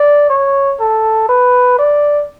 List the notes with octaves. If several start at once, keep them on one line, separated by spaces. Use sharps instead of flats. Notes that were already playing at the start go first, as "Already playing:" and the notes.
Already playing: D5
C#5
A4
B4
D5